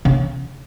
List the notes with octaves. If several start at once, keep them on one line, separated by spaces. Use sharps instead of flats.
C#3